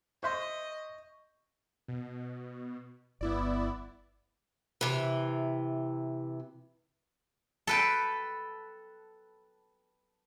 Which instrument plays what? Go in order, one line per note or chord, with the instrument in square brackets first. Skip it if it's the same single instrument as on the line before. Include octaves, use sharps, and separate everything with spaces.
[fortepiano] C5 E5 C6 [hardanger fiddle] D#5 [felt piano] C#6 G6
[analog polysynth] B2
[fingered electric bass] G1 [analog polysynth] B3 E4 D5
[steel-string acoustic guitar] C3 E3
[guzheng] A4 B4 G5